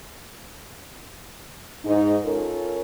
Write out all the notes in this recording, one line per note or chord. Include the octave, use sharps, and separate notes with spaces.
G#2 D#4
C#4 F4 A4 A#4